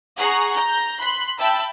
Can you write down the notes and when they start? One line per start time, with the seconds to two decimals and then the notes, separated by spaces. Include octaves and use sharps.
0.16 G#4 F#5 A#5 C#6 C7
0.54 A#5 G6
0.99 B5 C6 F#6
1.38 E5 G5 A5 B5 E6